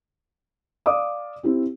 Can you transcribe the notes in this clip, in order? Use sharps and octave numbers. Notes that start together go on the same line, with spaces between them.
D5 F5 D6 D#6
C4 E4 G4